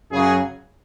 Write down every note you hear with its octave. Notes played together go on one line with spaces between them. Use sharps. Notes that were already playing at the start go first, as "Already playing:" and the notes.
F#2 C#3 F#3 G#4